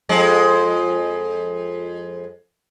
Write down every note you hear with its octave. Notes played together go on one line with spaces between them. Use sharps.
F2 G#3